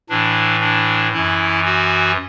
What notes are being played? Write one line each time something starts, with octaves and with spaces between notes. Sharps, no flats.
A2 E3 D4
D4
F#2 E3 E4
F#4